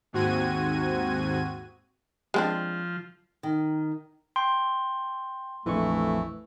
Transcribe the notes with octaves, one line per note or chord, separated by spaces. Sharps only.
D#2 G#2 C4 F#4 G#6 D#7
F3 G#3 C4 D4
D#3
G5 C6
A#1 F2 E3 A3 C#6